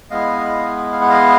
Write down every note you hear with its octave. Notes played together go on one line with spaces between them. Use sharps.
G#3 B3 E4 D#5 F5
F5
F#5
D#5 F5